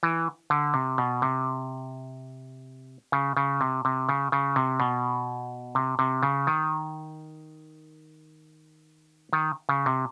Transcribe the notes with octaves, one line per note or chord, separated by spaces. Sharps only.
E3
D3
C3
B2
C3
C#3
C#3
C3
C3
C#3
C#3
C3
B2
C3
C3
C#3
D#3
D#3
C#3
C3